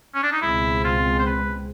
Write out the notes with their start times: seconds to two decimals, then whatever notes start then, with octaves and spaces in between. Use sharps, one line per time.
0.15 C#4
0.23 D4
0.33 D#4
0.42 C#2 B2 G#3 C4 E4
0.84 F4
1.19 C5
1.27 B4